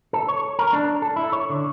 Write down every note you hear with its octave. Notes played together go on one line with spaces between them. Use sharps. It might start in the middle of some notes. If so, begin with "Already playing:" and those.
A4
C#5
A#4
D4
A4
E4
C#5
D3